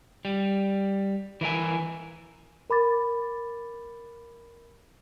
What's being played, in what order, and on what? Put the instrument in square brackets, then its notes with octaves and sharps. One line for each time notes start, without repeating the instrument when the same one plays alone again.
[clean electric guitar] G3
E3 E4 A#4 G#5
[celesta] A#4 B5 D6 A6